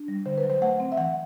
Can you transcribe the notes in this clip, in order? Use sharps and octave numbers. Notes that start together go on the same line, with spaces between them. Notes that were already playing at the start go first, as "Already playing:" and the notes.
Already playing: D4
G3
D3 C5
B4
F#3
C5
A3 F#5
C4
E5
E3 F#5